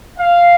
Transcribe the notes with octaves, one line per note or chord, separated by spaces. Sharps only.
F5